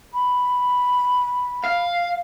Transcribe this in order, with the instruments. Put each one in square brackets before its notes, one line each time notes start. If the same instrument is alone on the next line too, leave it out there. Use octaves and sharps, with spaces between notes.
[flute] B5
[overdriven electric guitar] F5